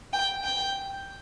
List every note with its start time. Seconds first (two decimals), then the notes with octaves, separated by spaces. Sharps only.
0.13 G5
0.44 G5